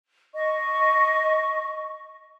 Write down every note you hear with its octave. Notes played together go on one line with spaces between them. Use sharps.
D#5 C#6